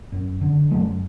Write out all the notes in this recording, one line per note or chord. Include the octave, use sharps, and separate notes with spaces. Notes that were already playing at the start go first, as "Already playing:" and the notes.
F#2
D3
F#2 F#3 A3